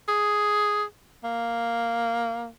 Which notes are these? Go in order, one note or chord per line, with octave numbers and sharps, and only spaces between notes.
G#4
A#3